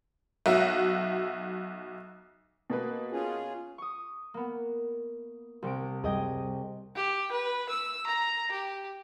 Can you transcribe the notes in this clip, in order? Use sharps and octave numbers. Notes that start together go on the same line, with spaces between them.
B1 F#4 E5
B2 A#3 B4
C#4 F4 G#4
C#6 D#6
A#3 B3
C2 C3 D7
C#2 F#2 G3 G#4 D#5 G5
G4
B4
E6
A#5
G4